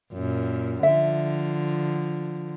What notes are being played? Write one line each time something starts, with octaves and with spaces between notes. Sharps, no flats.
F#2 A#2
D3 F3 E5